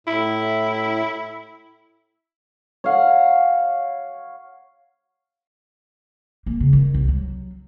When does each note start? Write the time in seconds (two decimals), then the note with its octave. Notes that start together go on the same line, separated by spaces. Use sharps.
0.07 A2 E4
2.84 C#5 F5 F#5
6.46 A#3
6.60 C#3
6.73 D#3
6.94 C2
7.09 F#3